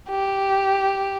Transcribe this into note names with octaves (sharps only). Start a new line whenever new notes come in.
G4